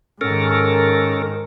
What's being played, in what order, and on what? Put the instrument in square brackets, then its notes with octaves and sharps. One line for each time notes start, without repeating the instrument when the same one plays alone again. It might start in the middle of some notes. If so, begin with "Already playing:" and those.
[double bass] G#2 D#3 [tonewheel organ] C#4 A4 A#4